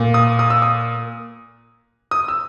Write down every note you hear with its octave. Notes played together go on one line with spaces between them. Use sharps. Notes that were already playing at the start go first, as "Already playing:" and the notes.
Already playing: A#2 A#3
D#6
D#6
E6
D#6
D#6
E6